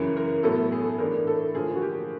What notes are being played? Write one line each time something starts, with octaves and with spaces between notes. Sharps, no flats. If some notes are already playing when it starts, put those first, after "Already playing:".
Already playing: F#2 C#3 E3 A#4
A#4
A2 F#3 B3 E4 A4
A4
G#4
A4
A2 E3 A3 D4 A#4
A4
D3 F3 A#3 G#4
F#4
G4